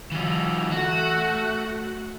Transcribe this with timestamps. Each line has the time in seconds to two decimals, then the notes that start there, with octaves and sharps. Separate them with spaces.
0.12 E3 F#3
0.71 A3 F#4 F#5